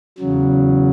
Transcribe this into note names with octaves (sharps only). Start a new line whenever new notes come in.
E2 C#3 F#3